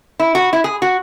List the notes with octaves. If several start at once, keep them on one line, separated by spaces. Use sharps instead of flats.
E4
F#4
E4
G#4
F#4